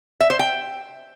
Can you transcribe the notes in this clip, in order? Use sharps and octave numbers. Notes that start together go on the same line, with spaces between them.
E5
C5
G5